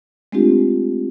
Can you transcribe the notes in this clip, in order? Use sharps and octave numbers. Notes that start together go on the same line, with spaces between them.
G#3 A3 C4 D4 F4 G4